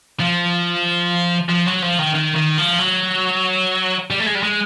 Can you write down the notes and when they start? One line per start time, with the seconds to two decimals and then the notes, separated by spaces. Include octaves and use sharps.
0.20 F3
1.49 F3
1.67 F#3
1.82 F3
1.99 D#3
2.15 D#3
2.36 D#3
2.58 F3
2.79 F#3
4.11 G3
4.20 A3
4.27 G#3
4.35 G3
4.43 G#3